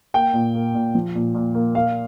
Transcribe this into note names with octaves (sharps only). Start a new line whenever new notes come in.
A#3 G5
A#2
A#3
A#2
F3
A#2
A#2
A#3
A#3 F5